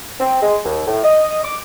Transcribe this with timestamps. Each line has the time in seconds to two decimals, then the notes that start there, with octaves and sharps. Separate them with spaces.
0.20 C4
0.43 G#3
0.65 D#2
0.87 A2
1.04 D#5
1.44 D6